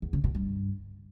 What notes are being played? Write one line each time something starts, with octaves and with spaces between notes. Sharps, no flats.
E2
C#3
B2
G2